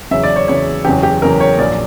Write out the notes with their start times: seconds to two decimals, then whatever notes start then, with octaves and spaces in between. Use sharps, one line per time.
0.11 E2 C#3 F#3 E5
0.23 D5
0.36 C#5
0.48 E2 C#3 F#3 C#5
0.85 F#1 E2 C#3 F#3 G4
1.03 G4
1.22 F#1 E2 C#3 F#3 A#4
1.40 C#5
1.59 A#1 A#2 F#3 D5